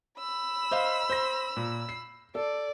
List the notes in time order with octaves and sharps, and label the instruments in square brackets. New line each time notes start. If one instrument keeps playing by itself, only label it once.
[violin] B5 E6
[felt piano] C5 D#5 F5
C5 A#6
A#2
C7
[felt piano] A4 [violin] D5